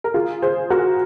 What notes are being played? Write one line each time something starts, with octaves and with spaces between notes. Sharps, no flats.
A#4
F4 G#4
G#4 C5
F#4 A#4